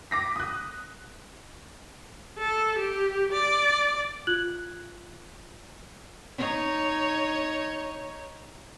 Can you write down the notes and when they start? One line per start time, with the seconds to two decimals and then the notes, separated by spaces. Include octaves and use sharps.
0.11 D6 A#6 B6
0.36 D#6 F#6
2.38 A4
2.78 G4
3.32 D5
4.27 F4 F#6 G#6 F#7
6.38 D#4 C#5